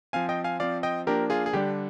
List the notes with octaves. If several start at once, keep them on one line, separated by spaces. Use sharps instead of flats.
F3 C4 F5 G#5
D#5 G5
F5 G#5
F3 C4 D5 F5
D#5 G5
F3 A#3 D4 G4 A#4
F4 G#4
G#4
D3 G3 D4 G4